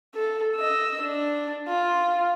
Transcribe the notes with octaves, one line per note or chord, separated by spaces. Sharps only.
A4
D#5 E6
D4
F4